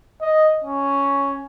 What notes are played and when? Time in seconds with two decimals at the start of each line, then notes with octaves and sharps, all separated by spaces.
0.22 D#5
0.64 C#4